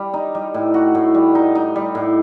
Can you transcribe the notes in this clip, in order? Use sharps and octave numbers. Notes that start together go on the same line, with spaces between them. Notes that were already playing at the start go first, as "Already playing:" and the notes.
Already playing: G3
D#4
G3
A2
F#4
A2
G3
D#4
D#4
G3
A2